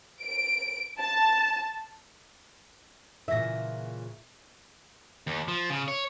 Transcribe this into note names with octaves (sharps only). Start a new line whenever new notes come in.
D7
A5
A#2 C#3 E3 E5 A#6
D#2
F3
C#3
C#5